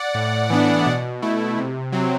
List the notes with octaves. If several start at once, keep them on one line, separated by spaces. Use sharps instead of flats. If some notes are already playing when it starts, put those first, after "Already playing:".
Already playing: D5 F#5
A2
E3 B3 D4
B2
A3 E4
C3
F#3 C4